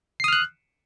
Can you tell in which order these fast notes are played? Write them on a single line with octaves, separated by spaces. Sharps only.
C7 D#6 F6 F#6